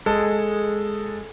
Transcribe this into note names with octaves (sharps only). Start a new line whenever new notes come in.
G#3 A4